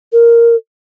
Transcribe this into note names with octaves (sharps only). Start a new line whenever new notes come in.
A#4